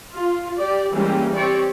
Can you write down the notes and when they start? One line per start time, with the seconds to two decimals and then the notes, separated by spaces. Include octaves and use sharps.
0.13 F4
0.58 G4 D5
0.91 E3 G3 G#3 A#3 C#4 G4
1.35 C4 G4 C#5 D5